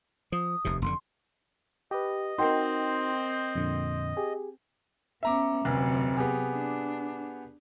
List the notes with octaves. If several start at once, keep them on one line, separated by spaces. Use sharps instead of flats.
F3 D#6
F1 D#2 C3
F1 D3 C6
G4 B4 D#5
C4 D#4 F#4 A#4 C5 G5 C6
F2 A#2 D3
G4 G#4
B3 C#4 E5 A#5 D6
F1 D2 C3 F#3
B3 G4 G#4
D4